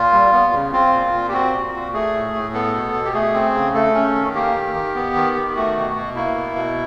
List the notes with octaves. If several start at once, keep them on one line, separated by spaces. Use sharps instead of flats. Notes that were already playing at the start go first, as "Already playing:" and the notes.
Already playing: A#2 F4
G3
B3
C#3
C4 F4
A#2
A#2
G4
C4 F#4
A#2
A#2
A3 G#4
A2
A2
B3 A4
B2
B2
G4
A3 G#4
C4
C#3
A3 A4
C#4
D#3
A#3 G4
D#3
D#3
B3
D#3
D#3
A3 F#4
B2
B2
A#3 E4
B2
B2